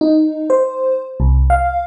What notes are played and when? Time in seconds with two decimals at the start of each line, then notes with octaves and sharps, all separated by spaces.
0.01 D#4
0.50 C5
1.20 C2
1.50 F5